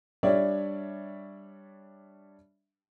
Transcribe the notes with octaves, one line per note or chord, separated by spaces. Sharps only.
G3 D4 C#5 D5 E5